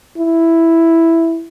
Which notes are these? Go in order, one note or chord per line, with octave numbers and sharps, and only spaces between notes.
E4